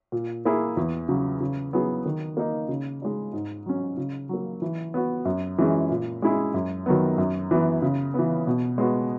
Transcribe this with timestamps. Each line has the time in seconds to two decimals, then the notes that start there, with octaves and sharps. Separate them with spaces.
0.12 A#2
0.45 A#3 E4 G#4
0.77 E2
1.09 C#3 F#3
1.40 C#3
1.73 F#3 B3 E4 G#4
2.05 D#3
2.37 A#3 D#4
2.69 C#3
3.02 G#3 D#4
3.33 G#2
3.66 F#3 C#4
3.97 C#3
4.29 F#3 A#3
4.62 E3
4.94 B3 F#4
5.25 F#2
5.58 E3 G#3 C#4 G#4
5.91 A#2
6.22 G#3 C#4 E4 G#4
6.54 F#2
6.86 D#3 F#3 B3
7.18 F#2
7.51 E3 B3
7.82 C#3
8.14 E3 B3
8.47 B2
8.78 G#3 B3 F#4